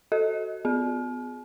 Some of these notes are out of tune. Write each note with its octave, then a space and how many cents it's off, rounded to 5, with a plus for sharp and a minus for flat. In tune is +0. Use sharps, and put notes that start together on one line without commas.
F#4 +10 A4 +0 D#5 +30
B3 +25 G#4 +0